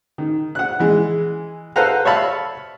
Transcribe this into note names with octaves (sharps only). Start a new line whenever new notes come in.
D#3
F#5 F#6
E3 G#3
A4 B4 C5 F5 F#5 A#5
C#5 E5 F5 A5 B5